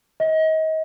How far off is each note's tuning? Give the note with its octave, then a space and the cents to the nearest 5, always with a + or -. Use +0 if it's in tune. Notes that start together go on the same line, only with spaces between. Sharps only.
D#5 +30